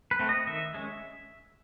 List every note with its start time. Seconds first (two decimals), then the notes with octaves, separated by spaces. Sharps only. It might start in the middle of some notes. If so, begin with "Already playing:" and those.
0.11 B4
0.19 A3 C4
0.29 D#5
0.47 D#3 E5
0.74 G#3 C#4